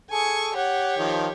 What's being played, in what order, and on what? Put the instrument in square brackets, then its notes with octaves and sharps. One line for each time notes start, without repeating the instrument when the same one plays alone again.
[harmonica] G#4 A4 [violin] G#5 C#6
[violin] G4 C#5 [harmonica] F#5
[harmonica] D#3 F3